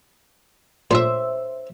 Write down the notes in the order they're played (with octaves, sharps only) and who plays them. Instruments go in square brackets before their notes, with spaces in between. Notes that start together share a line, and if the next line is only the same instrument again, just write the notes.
[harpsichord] A#2 A3 [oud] C5 E5